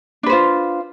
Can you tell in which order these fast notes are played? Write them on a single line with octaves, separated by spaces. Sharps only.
D4 B4 C5 F4